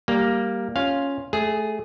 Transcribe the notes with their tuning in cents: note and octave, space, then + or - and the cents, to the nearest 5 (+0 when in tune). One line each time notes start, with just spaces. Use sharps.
G3 +0 A#3 +0
C#4 +0 F4 +5 F5 +0
A3 -20 G#4 +0